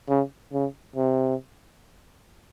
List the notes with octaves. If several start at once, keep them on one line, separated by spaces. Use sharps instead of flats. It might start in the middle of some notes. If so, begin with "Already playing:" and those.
C#3
C#3
C3